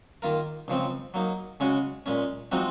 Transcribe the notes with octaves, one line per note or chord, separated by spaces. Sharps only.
D#3 A#3 F4 A#4
C#2 C#3 F3 C4
F#3 A#3 D#4
C#3 G#3 C#4 F#4
A#2 G#3 C#4
F3 G#3 C4 D#4 F#4